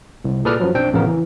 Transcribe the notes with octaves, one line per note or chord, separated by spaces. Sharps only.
C2
A#2 G#4 A4 B4 D5 F6
F#2 F3 F#3
B1 C4 D4 G5
A1 F2 C#3 B3 A#4
E3